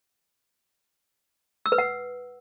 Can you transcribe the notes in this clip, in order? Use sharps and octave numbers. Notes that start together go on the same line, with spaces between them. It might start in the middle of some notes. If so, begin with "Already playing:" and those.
E6
B4
F#5